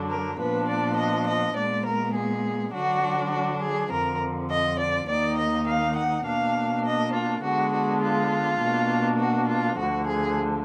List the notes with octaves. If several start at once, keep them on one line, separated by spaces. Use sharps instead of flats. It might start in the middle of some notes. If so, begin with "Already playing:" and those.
Already playing: F#2 D3 F#3 D4
A#4
A#2 F3 B3 D4 B4
D5
D#5
D#5
A#2 G#3 B3 D5
A#4
G#4
D3 F#3 D4 F#4
F#4
G#4
F2 D3 F3 A#4
D#5
D5
D#2 D#3 A#3 D#4 D5
D#5
F5
F#5
B2 A#3 D4 F5
D#5
F4
D3 G#3 B3 D4 F#4
F#4
F4
B2 A#3 D4
F#4
F4
D2 D3 F3 F#4
G#4